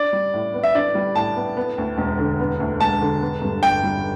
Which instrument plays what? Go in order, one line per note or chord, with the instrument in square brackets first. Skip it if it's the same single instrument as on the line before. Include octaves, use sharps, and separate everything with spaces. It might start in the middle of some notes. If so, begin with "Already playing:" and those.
Already playing: [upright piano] D4 [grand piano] D5
[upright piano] G3
A2
B3
[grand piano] E5
[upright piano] D4 [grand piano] D5
[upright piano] G3
[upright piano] A2 [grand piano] A5
[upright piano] B3
B3
D2
E1
D3
B3
D2
[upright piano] E1 [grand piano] A5
[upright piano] D3
B3
G2
[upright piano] G1 [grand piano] G5
[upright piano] G3